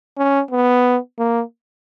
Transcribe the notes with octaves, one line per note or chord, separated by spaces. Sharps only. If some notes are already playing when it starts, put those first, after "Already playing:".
C#4
B3
A#3